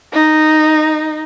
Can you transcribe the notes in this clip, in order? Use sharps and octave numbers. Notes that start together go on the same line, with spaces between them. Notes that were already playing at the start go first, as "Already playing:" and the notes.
D#4